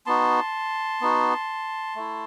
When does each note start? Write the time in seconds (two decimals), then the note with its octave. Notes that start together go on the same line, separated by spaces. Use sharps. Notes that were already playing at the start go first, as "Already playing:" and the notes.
0.06 B3 D#4 F#4 A5 C6
1.01 B3 D#4 F#4
1.96 A3 E4